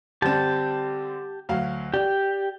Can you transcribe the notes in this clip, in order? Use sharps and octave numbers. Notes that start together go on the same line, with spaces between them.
D3 G3 C4 G4 A5
D2 F#3 F5
G4 D5